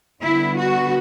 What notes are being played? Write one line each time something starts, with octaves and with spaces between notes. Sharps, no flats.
D3 G3 B3 E4
F#4